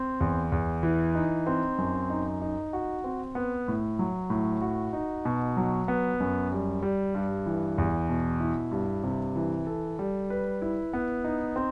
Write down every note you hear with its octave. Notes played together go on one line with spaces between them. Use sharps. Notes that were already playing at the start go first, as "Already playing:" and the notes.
Already playing: C4
E2
E2
E3
D#4
C4
F#2
D#4
D#4
F#4
C4
B3
A2
F#3
A2
F#4
D#4
B2
F#3
B3
F#2
G3
G3
G2
E3
E2
B2
E4
G2
C3
E3
A4
G3
B4
E4
B3
D#4
C4